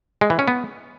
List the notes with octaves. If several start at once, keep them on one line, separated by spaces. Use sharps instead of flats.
G#3
E3
C#4
B3